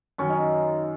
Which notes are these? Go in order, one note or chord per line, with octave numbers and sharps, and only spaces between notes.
F#2 D#3 F#3 C#4
D#4